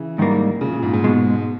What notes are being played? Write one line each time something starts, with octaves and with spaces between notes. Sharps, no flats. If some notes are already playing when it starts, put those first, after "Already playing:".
Already playing: C#3 E3
G#2 D#3 G3 A#3
A#2 C#3
A#2
G#2
G#2
B2 G#3